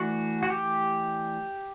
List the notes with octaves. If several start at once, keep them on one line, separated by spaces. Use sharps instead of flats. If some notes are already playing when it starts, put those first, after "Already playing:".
Already playing: E3 A3 D4 F#4
F#4
G4